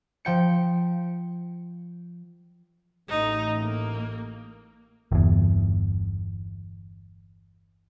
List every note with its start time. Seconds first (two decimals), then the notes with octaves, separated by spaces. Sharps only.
0.25 F3 G5 C#7
3.09 A1 A2 D#4
3.62 A#3
5.12 G1 E2